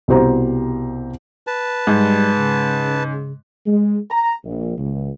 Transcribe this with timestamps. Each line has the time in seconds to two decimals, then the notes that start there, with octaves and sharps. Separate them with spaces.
0.08 C2 B2 G4 C5 A#5
1.47 B4 A5
1.87 G#2 G3
2.36 C#3
3.66 G#3
4.10 A#5
4.44 A#1
4.78 C#2